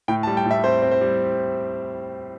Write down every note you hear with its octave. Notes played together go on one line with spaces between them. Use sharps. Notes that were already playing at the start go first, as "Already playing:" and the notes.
A2 G5
A5
G3
G5
A2
E5
C4 C5
C4
C5
G3